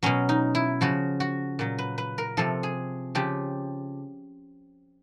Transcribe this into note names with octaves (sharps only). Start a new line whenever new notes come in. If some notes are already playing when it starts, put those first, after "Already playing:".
B2 F#3 C#4
D#4
E4
C#3 F3 F#4
F#4
A#2 F#3
B4
B4
A#4
C3 F3 A4
G#4
C#3 F3 G4